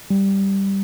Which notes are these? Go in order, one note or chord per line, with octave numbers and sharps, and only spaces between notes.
G3